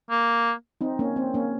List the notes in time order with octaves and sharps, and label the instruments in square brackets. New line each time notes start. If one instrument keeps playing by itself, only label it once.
[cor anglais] A#3
[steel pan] C4 D#4
A#3 C#4
C4
A#3 C#4